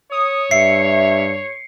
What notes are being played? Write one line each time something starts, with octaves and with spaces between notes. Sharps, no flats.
C#5 D#6
G2 E5 C7 C#7